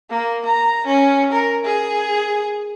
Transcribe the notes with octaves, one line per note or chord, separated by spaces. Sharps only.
A#3
A#5
C#4
A#4
G#4